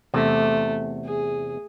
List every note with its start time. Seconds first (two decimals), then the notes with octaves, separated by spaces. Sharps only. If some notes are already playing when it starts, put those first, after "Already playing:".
0.14 E2 C3 A3
1.04 G#4